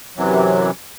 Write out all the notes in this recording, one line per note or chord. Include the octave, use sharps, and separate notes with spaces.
F#2 C3 E3 F#3